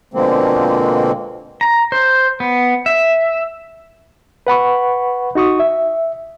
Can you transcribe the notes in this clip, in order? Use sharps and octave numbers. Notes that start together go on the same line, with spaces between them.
B2 D3 F3 G#3 A#3 C4
A#5
C5
B3
E5
B4 F#5 B5 C#6
D#4 F#4 C#6 D#6
E5